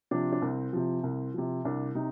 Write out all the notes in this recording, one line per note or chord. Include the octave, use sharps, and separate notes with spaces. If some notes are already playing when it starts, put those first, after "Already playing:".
C3 F3 D4
D4
C2 C4
C3 F3
C2
C3 F3
C2 D4
C3 D#4